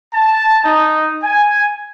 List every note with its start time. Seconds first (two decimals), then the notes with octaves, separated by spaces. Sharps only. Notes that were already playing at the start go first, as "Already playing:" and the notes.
0.14 A5
0.64 D#4
1.23 G#5